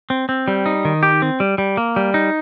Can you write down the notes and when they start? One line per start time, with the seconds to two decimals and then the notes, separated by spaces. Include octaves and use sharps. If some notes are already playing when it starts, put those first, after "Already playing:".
0.10 C4
0.29 C4
0.48 G3
0.66 D#4
0.85 D#3
1.03 G4
1.22 C4
1.40 G3
1.58 G3
1.77 A#3
1.96 G3
2.14 D#4